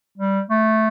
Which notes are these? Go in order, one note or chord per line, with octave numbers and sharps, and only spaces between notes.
G3
A3